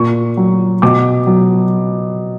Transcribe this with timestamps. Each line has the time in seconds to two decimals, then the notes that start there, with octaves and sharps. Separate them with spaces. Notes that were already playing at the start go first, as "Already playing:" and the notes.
Already playing: A#2 C#6
0.37 F#3
0.82 B2 D6
1.27 F#3